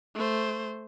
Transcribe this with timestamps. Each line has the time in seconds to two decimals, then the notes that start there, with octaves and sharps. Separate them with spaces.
0.15 A3 C5